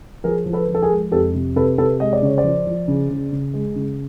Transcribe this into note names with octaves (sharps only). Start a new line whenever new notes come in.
F3 G#4 A#4
F3
A4 B4
F3
A4
G#4 A#4
G#3
F2 G4 A4
C3
C3 A4 B4
C3 A4 B4
G#3 D#5
D5
C#3 C#5
C5 D5
F3
F3
C#3
C#3
C#3
G#3
C#3